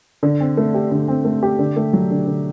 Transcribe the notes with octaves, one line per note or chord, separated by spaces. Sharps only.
D3
C4
A3
G4
D3
C4
A3
G4
D3
A3
F#3
D3
D3